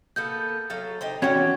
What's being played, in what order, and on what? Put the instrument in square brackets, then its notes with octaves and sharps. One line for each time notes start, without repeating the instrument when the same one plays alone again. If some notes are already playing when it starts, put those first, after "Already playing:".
[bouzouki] A#3 B3 A4 [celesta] G6
[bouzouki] F#3 A4 F5
D#4 G4 C5
[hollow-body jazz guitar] E2 C#4 F#4 [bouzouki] F3 G4 [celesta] G#6